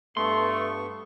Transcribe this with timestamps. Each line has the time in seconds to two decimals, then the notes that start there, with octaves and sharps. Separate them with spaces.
0.17 G2 A3 B3 C6 C#6